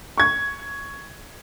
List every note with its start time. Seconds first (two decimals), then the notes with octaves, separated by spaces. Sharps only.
0.18 C#6 G#6